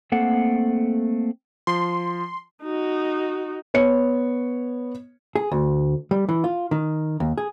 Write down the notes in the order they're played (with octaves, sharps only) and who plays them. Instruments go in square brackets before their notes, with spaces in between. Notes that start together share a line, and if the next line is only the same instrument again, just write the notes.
[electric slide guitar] A3 A#3 C4 A4 F#5
[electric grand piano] F3 [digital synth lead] C6
[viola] D#4 F#4
[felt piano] B3 C#5 C#7
[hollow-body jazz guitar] G#4
D2
G3
E3
F4
D#3
D#2
G#4